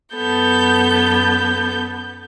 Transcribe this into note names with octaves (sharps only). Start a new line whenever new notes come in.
F#2 B3 A4 G6